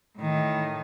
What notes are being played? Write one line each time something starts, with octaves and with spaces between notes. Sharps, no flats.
A2 D#3